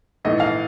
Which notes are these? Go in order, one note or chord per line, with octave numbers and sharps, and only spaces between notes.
A#1 G#2 E3 A3 D#5
F5